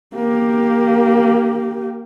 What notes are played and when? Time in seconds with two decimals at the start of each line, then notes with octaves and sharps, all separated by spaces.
0.15 A#3 G4